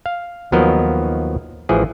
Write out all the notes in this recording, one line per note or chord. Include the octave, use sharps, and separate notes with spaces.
F5
D#2 F3 F#3 B3 A#4 D#5
A1 E3 F3 G#4